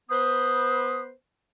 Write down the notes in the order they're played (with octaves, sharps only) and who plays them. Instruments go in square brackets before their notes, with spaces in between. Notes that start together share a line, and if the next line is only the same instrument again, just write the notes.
[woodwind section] B3 B4 C5 [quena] D#6